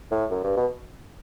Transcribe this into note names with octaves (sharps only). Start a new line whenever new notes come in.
A2
F#2
G2
B2